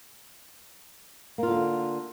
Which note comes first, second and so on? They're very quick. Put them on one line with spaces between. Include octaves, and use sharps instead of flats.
A#3 F4 D3